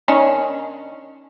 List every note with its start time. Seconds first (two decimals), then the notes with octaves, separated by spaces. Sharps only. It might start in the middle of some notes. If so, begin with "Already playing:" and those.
0.08 D#3 C#4 D4